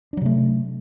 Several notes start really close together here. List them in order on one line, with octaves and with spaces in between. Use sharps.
D4 F#3 C3 A3